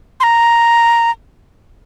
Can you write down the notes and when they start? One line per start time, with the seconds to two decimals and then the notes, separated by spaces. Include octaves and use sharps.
0.20 C6
0.23 A#5